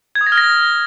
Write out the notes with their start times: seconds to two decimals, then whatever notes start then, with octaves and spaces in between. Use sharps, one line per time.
0.15 G#6
0.21 D#6
0.26 A#6
0.32 F6
0.38 A#6